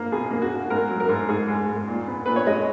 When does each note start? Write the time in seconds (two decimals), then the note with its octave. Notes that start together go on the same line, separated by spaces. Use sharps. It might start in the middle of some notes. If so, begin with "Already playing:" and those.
Already playing: A#3 A#4
0.12 B2 G#4
0.31 A#3
0.42 F#4
0.50 B2
0.70 G#2 A#4
0.90 F#3
1.00 A#4
1.09 G#2
1.29 G#2 G#4
1.48 G#2
1.69 G#2
1.87 A#2
2.08 B3
2.26 A#2 B4
2.36 C#5
2.46 G#3 D#5